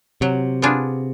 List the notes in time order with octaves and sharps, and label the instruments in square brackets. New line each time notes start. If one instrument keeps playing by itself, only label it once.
[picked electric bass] C3 [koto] F#3
[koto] B3 D4 F4 G#4